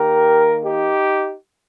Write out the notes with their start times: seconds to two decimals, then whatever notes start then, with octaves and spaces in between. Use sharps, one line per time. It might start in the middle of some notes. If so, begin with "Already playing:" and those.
Already playing: D#3 A#3 G4 A#4
0.63 D#4 G4